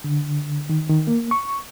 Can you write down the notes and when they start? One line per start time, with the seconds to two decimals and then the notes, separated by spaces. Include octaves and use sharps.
0.04 D3
0.70 D#3
0.90 D#3
1.07 A#3
1.31 C#6